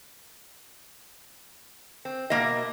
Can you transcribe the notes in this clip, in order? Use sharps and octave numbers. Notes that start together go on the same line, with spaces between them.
C4
B2 A#3 D#5